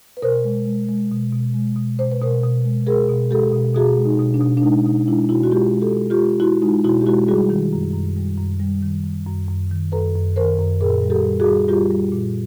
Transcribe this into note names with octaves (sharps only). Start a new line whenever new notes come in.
B4
B2 A#4 C5
G#3
G#3
G#3
B2
B2
G#3
B2
B2 C5
B4
B2 A#4 C5
B2
G#3
G#3 G#4 A#4
B2
G#3 G4 A4
B2
B2 F#4 G#4
G#3
D#4
B2
D4
B2
D4
G#3 D#4
B2 D#4
G#3 D4 E4
B2 E4 F#4
F#4
G#3 F4 G4
G#3
G4 A4
G#3
F4 G4
G#3
G#3 E4 F#4
G#3 D#4 F4
B2 E4 F#4
G4
G#3 E4 F#4
G3 F#4 G#4
D#3
F#2
F#2
G3
F#2
G3
D#3
F#2
F#2
F#2
D#3
F#2 A4 B4
F#2
D#3 A#4 C5
F#2
A#2 G#4 A#4
G3
G4 A4
G3
F#4 G#4
G3
G3 F4 G4
G3
A#2